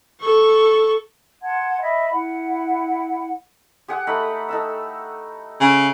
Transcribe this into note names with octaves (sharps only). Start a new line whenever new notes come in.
A4 C#6
F#5 A5 C6 G#6
D#5 E5 B5
E4 F#5
G4 G#4 F#5
A3 D#4 B5
D#4 A4 E6
C#3